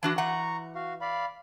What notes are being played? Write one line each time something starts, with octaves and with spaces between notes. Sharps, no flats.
E3 D4 F#4 A5
E3 F#5 A#5 C#6
F#4 F5
D5 F5 B5